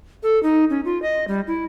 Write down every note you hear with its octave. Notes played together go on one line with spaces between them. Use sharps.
A4
D#4
C#4
F4
D#5
G3
E4